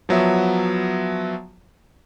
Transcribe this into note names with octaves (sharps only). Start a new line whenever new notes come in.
F3 F#3 B3 E5